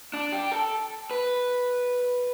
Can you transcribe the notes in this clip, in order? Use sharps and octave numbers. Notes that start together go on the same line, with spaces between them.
D4
G4
A4
B4